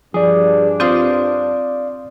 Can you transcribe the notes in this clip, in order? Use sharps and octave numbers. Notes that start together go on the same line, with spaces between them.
G2 F3 D4 G#4 D5
C4 F4 C5 D5 F5 C6 D#6 G6